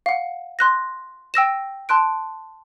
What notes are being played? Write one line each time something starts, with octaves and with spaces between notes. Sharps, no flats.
F5 F#5
C6 F#6 A#6
G5 E6 A#6 E7
A5 C6 F#6 D7